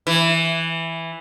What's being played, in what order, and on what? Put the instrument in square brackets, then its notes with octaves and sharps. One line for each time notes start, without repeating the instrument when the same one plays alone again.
[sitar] E3